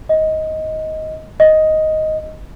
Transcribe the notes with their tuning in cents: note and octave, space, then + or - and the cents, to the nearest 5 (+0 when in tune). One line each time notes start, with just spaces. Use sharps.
D#5 +15
D#5 +5